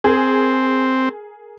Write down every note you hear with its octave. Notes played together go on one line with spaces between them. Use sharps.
C4 G#4 A#4